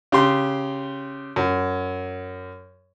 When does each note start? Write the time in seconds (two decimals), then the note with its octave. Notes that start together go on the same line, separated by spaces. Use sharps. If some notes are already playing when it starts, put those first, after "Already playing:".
0.12 C#3 G4 C6
1.36 F#2